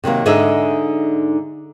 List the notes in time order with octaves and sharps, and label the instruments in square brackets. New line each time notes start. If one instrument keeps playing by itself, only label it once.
[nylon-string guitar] C3 D#3 F#3 A#3
G#2 D3 D#4 G#4 D#5 E5